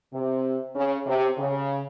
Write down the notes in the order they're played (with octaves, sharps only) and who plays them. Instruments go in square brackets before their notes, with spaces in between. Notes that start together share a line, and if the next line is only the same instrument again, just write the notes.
[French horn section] C3
C#3
C3
C#3